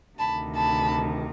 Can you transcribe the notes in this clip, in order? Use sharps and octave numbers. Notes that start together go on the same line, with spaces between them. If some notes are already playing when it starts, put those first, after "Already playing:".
D2 C3 D#3 A5 B5
A5 B5